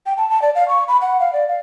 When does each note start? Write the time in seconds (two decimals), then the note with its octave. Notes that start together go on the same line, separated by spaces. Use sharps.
0.06 G5
0.17 A5
0.29 A5
0.42 D5
0.55 F5
0.68 C#6
0.88 B5
1.01 F#5
1.20 F5
1.33 D5
1.48 F5